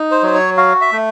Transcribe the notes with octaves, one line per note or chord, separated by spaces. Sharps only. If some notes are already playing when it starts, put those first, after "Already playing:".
Already playing: D#4
C5
F#3 C5
C#5
F#4 F5
E5
A3